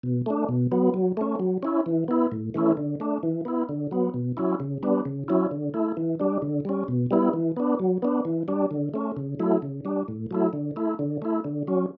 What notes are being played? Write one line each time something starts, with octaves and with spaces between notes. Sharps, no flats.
B2
A3 D4
B2
F#3 B3
F#3
A3 C#4
F#3
C#4 E4
E3
B3 E4
A2
E3 A3 C#4 E4
D3
A3 D4
E3
B3 E4
D3
F#3 B3
B2
F#3 C#4 E4
C#3
G3 B3 D4
C#3
F#3 C#4 E4
D3
A3 E4
E3
G3 D4
D3
G3 C#4
B2
G3 B3 E4
E3
B3 D4
F#3
B3 D4
E3
G3 D4
D3
A3 C#4
C#3
F#3 A3 E4
C#3
G3 D4
A2
F#3 A3 E4
D3
A3 E4
D3
A3 E4
D3
F#3 C#4